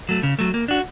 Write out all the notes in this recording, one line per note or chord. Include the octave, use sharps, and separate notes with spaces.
F#3 A3
C#3
F#3 A3
A#3
D4 F#4